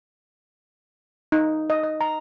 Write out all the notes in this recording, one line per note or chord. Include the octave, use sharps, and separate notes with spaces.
D#4
D#5
D#5
A#5